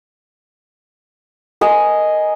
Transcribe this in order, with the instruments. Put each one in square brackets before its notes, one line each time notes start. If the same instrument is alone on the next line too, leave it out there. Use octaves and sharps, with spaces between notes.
[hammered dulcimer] A#4 D#5 G#5